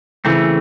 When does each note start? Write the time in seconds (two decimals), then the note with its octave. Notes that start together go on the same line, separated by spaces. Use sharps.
0.25 C#3 E3 A3 C4